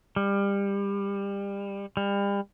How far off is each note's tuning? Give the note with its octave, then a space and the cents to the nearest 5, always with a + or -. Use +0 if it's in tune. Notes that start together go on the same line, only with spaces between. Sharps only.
G3 +25
G3 +35